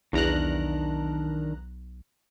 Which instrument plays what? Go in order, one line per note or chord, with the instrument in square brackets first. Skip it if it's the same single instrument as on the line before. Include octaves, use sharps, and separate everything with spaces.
[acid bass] B1 [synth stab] E2 A#5 F#6 [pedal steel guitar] D#3 D4 A#4